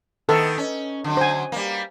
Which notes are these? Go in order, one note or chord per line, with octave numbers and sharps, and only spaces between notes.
D#3 B3 A4
C#4
D3 F#3
C5 G#5
G3 A#3